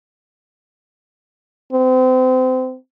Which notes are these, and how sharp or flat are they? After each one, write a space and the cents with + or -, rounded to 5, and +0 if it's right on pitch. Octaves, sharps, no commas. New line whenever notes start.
C4 -30